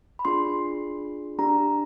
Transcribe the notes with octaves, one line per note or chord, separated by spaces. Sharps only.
B5
D4 F4 G#4 C6
D4 G4 A#5